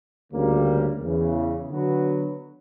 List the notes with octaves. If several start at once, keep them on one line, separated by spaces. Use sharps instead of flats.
D2 C#3 G3 A#3
E2 C#3 E3
D3 F#3 B3 F#4 B4